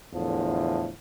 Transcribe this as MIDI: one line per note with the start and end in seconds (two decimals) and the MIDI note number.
0.13 0.90 40
0.13 0.90 45
0.13 0.90 50
0.13 0.90 53